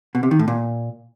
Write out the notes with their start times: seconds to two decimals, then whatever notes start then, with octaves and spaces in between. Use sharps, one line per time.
0.15 B2
0.23 C3
0.31 D#3
0.39 A2
0.48 A#2